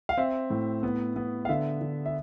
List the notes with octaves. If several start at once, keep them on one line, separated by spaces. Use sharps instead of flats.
F5
C4 E5
A2
B3
B3
F5
D3 E5
D3
E5